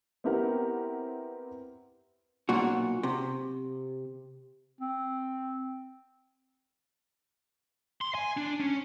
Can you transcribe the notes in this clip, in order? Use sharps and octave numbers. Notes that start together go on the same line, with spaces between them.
B3 C4 E4 G4 A#4 F#5
B1 A#2 F#4
C3
C4
C6
G#5
D4
C#4